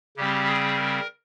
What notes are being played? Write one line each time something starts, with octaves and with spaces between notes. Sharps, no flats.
C#3 G3 C4 G4
G#4
A#4